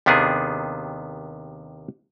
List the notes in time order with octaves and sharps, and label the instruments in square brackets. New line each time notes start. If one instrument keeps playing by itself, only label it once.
[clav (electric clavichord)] D#2 C3 D#3 B3 D4 G#4